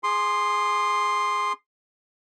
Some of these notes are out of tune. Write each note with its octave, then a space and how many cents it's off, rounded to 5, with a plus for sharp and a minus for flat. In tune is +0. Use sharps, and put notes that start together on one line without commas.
G#4 +0 C6 +0 D#6 -35